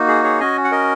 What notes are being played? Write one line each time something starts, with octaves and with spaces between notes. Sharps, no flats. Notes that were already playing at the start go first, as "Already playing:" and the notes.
Already playing: A#3 D#4 F#4
G#4
G#4 C#5
C#4 F#4 D#5 G#5
F#5
A#4 D#5